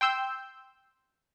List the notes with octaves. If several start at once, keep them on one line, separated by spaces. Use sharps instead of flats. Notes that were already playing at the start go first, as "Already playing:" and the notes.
G5 C6 E6 G6